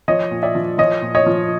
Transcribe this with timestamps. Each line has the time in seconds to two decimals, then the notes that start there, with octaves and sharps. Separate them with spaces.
0.08 F3 C#5 D#5
0.31 A#2
0.43 D5 E5
0.55 F3
0.78 F3 C#5 D#5
1.02 A#2
1.15 C#5 D#5
1.26 F3